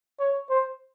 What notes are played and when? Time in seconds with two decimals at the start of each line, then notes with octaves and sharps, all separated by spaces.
0.20 C#5
0.50 C5